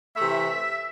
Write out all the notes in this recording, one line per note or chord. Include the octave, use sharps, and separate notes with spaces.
C3 E3 A3 E5